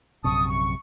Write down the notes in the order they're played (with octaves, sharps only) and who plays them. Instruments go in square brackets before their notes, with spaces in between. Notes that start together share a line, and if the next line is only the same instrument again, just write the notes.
[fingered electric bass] A#1 F#2 C3 [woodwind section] A5 C#6 D#6
[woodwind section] C#6